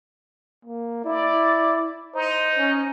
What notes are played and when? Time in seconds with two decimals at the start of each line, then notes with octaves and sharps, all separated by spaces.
0.65 A#3
1.05 E4 D5
2.15 D#4 C5
2.58 C#4